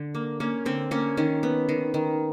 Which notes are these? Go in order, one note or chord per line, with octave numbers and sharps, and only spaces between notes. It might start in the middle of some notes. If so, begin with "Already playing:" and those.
Already playing: D3
A#3
A#3 C#4
D3 C4
A#3 C#4
D#3 C#4
B3
D#3
D#3